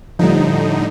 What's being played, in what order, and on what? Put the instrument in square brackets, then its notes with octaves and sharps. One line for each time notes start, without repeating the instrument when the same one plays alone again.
[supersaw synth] A2 D3 D#4 [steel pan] F3 G3